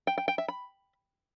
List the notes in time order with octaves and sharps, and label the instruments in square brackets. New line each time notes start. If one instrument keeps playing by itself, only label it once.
[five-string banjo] G5
G5
G5
E5
B5